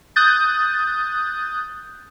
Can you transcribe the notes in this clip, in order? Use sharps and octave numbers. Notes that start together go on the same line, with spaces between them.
D#6 F#6 G6 A6